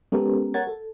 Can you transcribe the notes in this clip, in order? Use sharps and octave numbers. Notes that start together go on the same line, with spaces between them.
G#3 B3 C#4 G4 A4 A#4
A#4 C#5 F#5 G#6 A6
A4